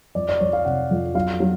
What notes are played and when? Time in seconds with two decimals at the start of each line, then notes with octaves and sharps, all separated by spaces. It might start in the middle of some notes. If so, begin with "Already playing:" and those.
0.15 F2 D5
0.29 D5
0.40 F2 C#5
0.53 F5
0.65 C3 F#5
0.91 F2
1.15 F#3 F5
1.40 F#3